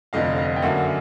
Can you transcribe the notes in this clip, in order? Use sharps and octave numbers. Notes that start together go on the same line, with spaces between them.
F1 F2 D3 D#5 F5
D#5 F5
G5
F#2 D3 F#3 A#3 E5 F#5